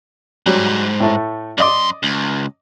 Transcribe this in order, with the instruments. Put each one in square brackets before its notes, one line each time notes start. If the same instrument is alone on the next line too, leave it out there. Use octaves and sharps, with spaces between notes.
[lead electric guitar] G#2 [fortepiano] F#3 G3
[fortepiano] A2 A3
[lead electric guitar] F#2 C6 [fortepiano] D5 D#5 D6
[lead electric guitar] C#2